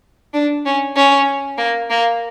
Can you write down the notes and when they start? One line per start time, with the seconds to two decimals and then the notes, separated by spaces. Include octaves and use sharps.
0.34 D4
0.66 C#4
0.96 C#4
1.58 A#3
1.90 A#3